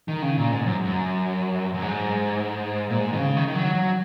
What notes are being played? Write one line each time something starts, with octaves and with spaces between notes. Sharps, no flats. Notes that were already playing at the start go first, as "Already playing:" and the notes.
D#3
C#3
A#2
G#2
F#2
F#2
F#2
G#2
A#2
G#2
D#3
C#3
D#3
D#3
F#3
F#3